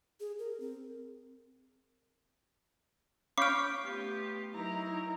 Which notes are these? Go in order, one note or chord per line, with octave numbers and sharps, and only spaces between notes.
G#4
A#4
C4
C#4 F5 B5 D6 F6 G6 D7
A3 B3 F4 G4
F#3 D#4 E4 A#4 A#5